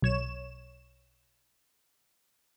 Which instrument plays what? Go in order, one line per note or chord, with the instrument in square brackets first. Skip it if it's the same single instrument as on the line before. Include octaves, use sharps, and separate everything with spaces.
[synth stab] B1 C#5 E7